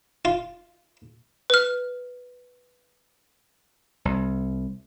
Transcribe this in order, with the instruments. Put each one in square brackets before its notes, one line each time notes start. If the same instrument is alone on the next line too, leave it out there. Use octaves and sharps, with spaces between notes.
[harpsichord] F4
[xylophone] B4 F6
[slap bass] C2